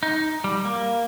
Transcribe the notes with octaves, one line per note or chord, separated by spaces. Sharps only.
D#4
G3
A#3